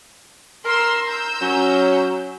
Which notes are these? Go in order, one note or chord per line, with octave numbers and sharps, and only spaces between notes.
A#4 C6 E6
A#5 E6 G6
F#3 C#4